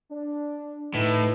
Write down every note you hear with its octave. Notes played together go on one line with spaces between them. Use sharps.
D4
A2 E3 D#4 B4